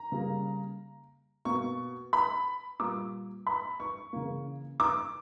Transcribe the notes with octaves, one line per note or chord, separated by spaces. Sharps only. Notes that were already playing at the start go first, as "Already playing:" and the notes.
Already playing: A#5
C#3 G3 A#3
B2 A#3 C#6
B5
A#2 G3 A#3 D6
B5
C#6
C#3 E3 A#3
D6